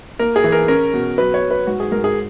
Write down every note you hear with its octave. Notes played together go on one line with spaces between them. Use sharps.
A#3 A#4
G#4
E3
A#4
C#4 A#4
B2
F#3 B4
C#5
F#3
B4
G#2 F#4
G#4
G#2 A#4
G#4